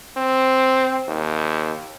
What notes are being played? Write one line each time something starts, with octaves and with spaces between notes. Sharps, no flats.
C4
D#2